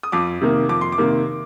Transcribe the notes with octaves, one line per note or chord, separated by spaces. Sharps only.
D#6
F2 D6
C3 D#3 A#3
F2 D6
C6
D6
C3 D#3 A#3